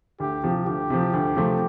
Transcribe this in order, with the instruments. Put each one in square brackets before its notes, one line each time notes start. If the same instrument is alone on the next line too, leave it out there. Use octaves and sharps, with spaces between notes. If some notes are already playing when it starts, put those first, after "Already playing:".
[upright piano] D2 [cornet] G4
[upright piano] C3 F3
[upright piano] D2 [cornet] G4
[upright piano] C3 F3
D2
C3 F3 A3 C4